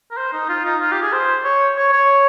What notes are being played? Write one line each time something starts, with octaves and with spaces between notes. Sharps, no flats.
A#4
C5
D#4
F4
D#4
F4
G4
G#4
C5
C#5
C#5
C#5